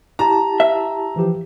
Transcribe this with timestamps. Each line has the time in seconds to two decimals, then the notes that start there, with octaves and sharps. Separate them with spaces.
0.19 E4 G4 A5 A#5
0.60 E5
1.16 E3 F3 G4